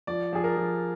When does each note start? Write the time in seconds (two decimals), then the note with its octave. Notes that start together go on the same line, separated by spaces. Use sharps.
0.07 F3 D5
0.33 F3 G#4
0.44 A#4
0.57 F3